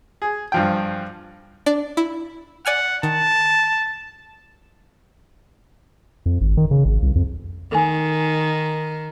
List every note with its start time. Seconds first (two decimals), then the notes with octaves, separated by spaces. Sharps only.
0.22 G#4
0.52 G2 F3 G5
1.66 D4 D5
1.97 E4
2.66 D5 F#5 G#5 F6
3.03 D#3 A5
6.26 F2
6.41 G#1
6.57 D#3
6.71 C#3
6.85 G#1
7.02 C2
7.15 F2
7.72 D#3 A4 G#5